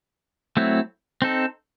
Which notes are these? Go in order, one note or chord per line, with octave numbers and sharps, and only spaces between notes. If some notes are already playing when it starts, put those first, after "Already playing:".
F#3 A3 C4 E4
C4 D#4 A4